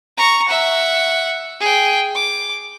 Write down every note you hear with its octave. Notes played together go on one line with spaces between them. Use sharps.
A#5 C#6
E5 F#5
G#4 G5
D6